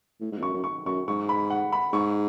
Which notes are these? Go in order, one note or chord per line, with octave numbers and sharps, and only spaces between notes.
A2
G#2
E2
F#2 C#6
F#2
C#6
F#2 C#6
G#2 C#6
B5
F#5
B5
G#2 C#6